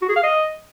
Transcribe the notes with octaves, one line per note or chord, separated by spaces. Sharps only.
F#4
G#4
F5
D#5